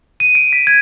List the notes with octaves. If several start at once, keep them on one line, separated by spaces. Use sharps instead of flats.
D#7
D7
B6
G#6